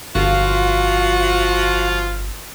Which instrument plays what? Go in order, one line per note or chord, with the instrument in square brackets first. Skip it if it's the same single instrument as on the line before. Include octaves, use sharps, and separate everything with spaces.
[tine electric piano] G1 [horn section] F3 F4 [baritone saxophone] F#4 [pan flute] F5